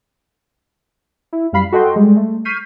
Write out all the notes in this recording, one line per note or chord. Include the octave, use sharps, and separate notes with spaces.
E4
F#2 G3 F5 B5 C7
F#4 A4 D#5 F#5 G5 C6
G3 G#3
A3
C#6 F6 G6 B6 C7 D#7